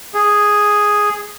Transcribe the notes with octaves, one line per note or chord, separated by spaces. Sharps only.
G#4